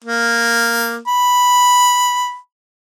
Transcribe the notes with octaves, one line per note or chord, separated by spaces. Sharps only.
A#3
B5